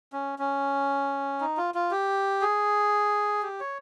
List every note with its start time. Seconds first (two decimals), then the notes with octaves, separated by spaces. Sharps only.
0.13 C#4
0.39 C#4
1.41 D#4
1.57 F4
1.75 F4
1.91 G4
2.42 G#4
3.43 G4
3.60 C#5